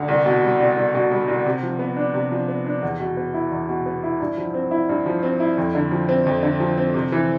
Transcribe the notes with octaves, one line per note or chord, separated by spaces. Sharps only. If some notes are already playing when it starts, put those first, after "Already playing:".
Already playing: D2
C2
B2
G3
C2
C2
B2
G3
C2
C3
F3
B3
D4
C3
F3
B3
D4
E2
B2
B3
E4
E2
B2
B3
E4
G2
F3
C4
E4
G2
F3
C4
E4
F2
D3
F3
C4
F2
D3
F3
C4
C3
E3